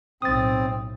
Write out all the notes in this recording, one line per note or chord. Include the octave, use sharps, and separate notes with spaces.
B1 A2 C4 D#6 A6